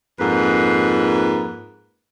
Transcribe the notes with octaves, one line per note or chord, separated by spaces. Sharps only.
F2 G#2 A#3 B4